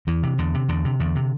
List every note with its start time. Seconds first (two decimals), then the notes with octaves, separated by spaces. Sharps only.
0.07 E2 E3
0.23 C3
0.38 E2 D3
0.54 C3
0.69 E2 D3
0.85 C3
1.00 E2 D3
1.15 C3